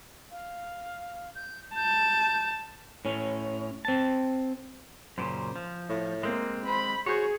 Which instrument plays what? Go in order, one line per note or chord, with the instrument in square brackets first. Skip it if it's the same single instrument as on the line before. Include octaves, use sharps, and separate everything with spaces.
[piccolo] F5
G6
[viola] A5 [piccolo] G6
[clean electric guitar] A2 C#4
C4 A5
[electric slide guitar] F#2 A#2 C#3 [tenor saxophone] C5
[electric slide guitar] F3
[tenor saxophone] A2
[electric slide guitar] G#3 C4 [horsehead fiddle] A#3
[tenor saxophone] C5 [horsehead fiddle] B5
[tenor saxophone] F#4 [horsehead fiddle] G#4 [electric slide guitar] C5 C#5